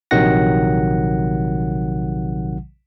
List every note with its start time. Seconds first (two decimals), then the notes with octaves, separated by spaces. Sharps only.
0.11 A#1 C3 D#3 F#3 F#5 A#6